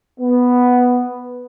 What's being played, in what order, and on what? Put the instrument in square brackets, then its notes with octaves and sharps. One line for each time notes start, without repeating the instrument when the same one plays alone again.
[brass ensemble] B3